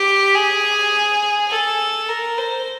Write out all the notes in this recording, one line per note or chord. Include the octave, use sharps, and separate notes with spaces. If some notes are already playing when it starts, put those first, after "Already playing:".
Already playing: G4
G#4
A4
A#4
C5